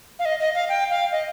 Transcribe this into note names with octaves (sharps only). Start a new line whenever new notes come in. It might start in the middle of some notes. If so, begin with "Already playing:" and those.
F5
D#5
D#5
F5
G5
F5
D#5